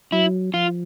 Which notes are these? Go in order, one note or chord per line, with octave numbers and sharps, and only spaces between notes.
F#3 E4
F3 F4